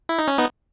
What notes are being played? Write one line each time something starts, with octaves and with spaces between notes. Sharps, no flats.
E4
D#4
C#4
B3 D#4